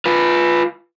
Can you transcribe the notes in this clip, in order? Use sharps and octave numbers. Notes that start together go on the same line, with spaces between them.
F4 B4